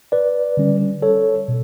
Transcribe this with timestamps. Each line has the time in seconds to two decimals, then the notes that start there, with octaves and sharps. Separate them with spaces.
0.12 B4 D5
0.57 D3 G3 C#4
1.02 A4 C#5
1.48 B2